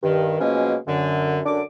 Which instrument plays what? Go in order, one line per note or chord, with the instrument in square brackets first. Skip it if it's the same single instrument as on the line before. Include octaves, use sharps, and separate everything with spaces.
[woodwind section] G2 D#3
B2 F3 F#3 G#3 A#3 C#4
F#2 D3
F#2 D3 D4 D6